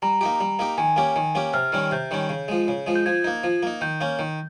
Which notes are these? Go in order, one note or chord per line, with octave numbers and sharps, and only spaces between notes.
G3 A#5
A#3 D#4 G4
G3
A#3 D#4 G4
D#3 G#5
A#3 C#4 G4
D#3
A#3 C#4 G4
C3 F6
D#3 G3 C#4
C3 G6
D#3 G3 C#4
C#3
F3 G#3
C#3
F3 G#3
G6
F3 G#6
A#3 D#4
F3
A#3 D#4
D#3 G6
A#3 C#4
D#3